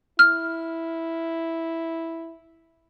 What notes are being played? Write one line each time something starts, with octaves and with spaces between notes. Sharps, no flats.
E4 F6